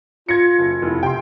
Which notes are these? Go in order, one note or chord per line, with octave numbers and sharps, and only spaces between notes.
F4 G#6 A#6 C#7
F#1
F1 E4
C3 G5 C6